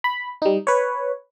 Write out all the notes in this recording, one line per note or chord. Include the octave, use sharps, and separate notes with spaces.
B5
G3 D#4
B4 C#5